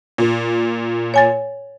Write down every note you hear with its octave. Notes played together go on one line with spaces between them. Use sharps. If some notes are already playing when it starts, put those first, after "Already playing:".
A#2
C#5 G#5 A6